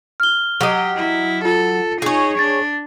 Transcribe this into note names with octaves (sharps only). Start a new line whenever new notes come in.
F6 G7
F#3 G4 D#5
E4
F4 A4
D#4 G#4 C#5
D4 A6